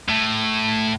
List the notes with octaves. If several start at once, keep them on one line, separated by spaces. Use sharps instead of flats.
A2